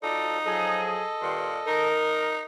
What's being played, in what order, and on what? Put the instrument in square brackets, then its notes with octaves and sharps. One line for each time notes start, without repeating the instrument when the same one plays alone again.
[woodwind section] F3 F#4 D5 [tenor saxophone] D#4 [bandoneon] A4
[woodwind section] F3 F#3 G#4 [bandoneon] A4 D#5
[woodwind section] G2 D#3 C6 [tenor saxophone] A#2
[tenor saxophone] D#4 [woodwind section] A#4